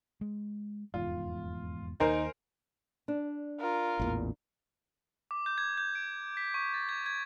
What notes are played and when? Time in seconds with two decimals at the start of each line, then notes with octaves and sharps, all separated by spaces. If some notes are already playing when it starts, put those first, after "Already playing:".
0.21 G#3
0.94 F1 E2 G#2 F4
2.00 D#2 D#4 A#4 C5 G#5 C6
3.08 D4
3.60 F4 A#4
4.00 A1 E2 A#2
5.31 D6
5.46 G6
5.58 G#6
5.78 G6
5.95 D7
6.37 B6
6.54 C#6
6.74 A6
6.89 G#6
7.06 G#6